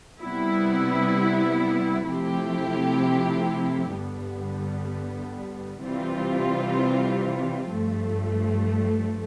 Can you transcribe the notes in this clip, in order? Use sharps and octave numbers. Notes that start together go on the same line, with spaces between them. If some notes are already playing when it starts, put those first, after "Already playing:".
C3 G3 B3 E4
C3 F3 A3 E4 G4
G2 D3 G3 B3
C3 E3 G3 C4 F4
G2 F3 A3